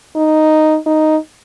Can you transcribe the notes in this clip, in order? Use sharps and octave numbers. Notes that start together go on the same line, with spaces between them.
D#4
D#4